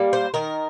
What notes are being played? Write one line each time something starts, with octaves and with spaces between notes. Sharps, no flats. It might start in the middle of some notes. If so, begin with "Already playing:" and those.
Already playing: G3 A#3
C5
D#3 A#4